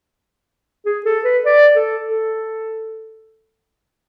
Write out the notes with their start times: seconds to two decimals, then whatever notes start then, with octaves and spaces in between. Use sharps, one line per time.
0.86 G#4
1.05 A4
1.25 B4
1.45 D5
1.76 A4
2.05 A4